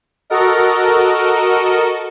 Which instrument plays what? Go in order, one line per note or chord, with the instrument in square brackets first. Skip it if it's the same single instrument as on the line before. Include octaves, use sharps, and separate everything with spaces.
[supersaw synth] F#4 A4 A#4 D#5